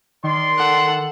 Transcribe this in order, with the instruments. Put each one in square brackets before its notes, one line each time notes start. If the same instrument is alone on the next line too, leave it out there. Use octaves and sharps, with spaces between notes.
[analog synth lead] D#3 [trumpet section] D5 C6
[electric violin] A4 F#5